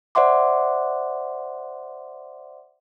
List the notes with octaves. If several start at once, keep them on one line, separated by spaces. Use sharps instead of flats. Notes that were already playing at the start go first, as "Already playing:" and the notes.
C5 D5 E5 F#5 C6 D6